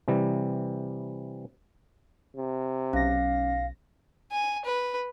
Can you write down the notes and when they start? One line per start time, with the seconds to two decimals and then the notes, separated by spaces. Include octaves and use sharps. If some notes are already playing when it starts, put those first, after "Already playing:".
0.08 C3 E3 G3
2.36 C3
2.93 B1 C#4 F5 A#6
4.32 G#5
4.65 B4